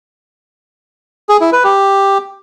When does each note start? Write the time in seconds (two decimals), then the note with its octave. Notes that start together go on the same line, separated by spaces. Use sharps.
1.29 G#4
1.41 E4
1.53 B4
1.64 G4